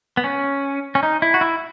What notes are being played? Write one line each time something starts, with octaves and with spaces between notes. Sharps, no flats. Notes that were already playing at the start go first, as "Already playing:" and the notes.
B3
C#4
C#4
D#4
E4
F#4
E4